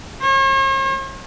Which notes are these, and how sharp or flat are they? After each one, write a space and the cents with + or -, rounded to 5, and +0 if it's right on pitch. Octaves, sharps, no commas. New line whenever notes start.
C#5 -45